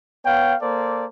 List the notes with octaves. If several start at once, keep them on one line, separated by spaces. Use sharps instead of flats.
B3 C#5 F5 G5
A#3 A4 C5 D5